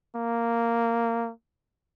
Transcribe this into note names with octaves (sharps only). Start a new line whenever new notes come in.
A#3